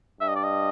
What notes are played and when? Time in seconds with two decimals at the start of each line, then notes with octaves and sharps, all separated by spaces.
0.21 G2 E5
0.28 D#5
0.36 D5
0.43 D#5